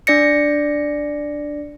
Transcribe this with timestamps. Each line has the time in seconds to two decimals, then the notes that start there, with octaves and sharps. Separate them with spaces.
0.07 D4 D5 A#6 C#7